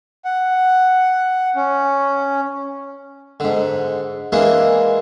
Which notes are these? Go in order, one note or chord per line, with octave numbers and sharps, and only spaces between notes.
F#5
C#4
G#2 D3
E3 G#3 A#3 D4